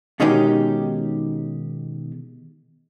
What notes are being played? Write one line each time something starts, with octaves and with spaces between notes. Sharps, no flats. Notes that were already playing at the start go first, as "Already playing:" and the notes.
B2 D#3 G#3 C#4 D#4 G4